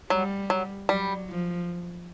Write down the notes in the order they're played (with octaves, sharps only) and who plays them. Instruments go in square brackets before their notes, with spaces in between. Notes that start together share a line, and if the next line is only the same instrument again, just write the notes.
[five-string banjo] F#3 [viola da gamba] G3
[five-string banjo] F#3
[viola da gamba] F#3 [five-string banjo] G3
[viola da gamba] F3